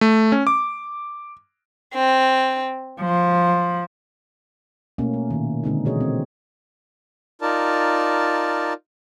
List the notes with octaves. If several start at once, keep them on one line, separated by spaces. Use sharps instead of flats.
A3
C#4
D6
C4
F3
B2 A3 A#3 C#4
A3
A#2 D#3
D3 G#3 C4 D4 D#4
B2 E3 F#4 G#4 C#5 D#5
C4
D#4 F4 A#4 D5 A5